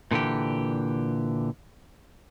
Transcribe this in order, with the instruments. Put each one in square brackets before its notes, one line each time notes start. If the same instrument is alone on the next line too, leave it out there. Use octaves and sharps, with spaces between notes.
[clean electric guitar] A#2 D3 E3 G4